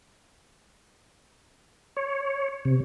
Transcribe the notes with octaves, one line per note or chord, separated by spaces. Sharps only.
C#5
C3